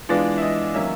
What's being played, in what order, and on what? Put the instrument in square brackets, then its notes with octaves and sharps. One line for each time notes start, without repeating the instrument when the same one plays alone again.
[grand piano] E3 G#3 B3 D4 F4 D5
E5
D#5
D#3 F#3 A#3 C#4 E5